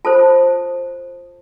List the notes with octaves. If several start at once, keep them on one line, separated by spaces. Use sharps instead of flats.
F4 A4 C5 A5